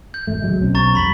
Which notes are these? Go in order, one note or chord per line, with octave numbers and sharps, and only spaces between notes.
G6
G#1 A3
C#2 F#3 G#3
B1 C4 C#4
A#5 C#6 A6
F2 G3 B5 B6 F#7